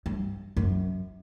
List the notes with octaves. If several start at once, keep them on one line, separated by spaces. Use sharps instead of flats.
G2
F#2